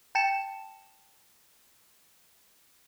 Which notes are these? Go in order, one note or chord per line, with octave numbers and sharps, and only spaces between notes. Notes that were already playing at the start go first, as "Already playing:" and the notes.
G5 A5 C#7 E7